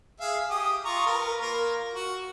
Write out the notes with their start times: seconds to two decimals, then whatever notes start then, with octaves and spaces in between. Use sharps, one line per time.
0.20 G#4 E5 F5
0.50 G4 D#6
0.85 F4 A#5 C#6
1.06 A#4 B4
1.41 A#3 F4 A#4
1.94 F#4